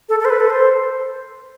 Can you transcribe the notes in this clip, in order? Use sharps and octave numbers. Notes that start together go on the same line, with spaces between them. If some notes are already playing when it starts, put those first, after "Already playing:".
A4
A4
C5
B4
A4
C5